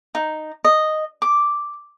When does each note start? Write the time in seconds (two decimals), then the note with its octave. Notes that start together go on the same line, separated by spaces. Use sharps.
0.15 D#4
0.65 D#5
1.22 D6